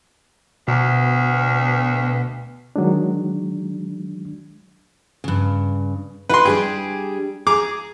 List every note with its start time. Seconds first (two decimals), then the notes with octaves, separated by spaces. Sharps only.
0.68 D2 B2
2.76 D#3 F#3 G#3 D4
5.24 G2 C#3
6.29 D#4 E4 F#4 B4 C6
6.45 G3 D4 G4 G#4
7.47 G#4 A#5 D6